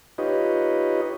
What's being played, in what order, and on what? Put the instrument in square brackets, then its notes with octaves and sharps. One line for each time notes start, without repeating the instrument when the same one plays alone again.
[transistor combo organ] D#4 F4 G4 B4 C#5 D#5